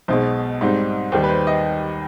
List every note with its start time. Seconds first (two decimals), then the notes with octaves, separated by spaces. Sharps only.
0.08 B1 B2 G#3 C5
0.61 G#2 G3 C4 D#4
1.12 D#2 D#3 G3 C5
1.24 B4
1.30 C5
1.47 D#5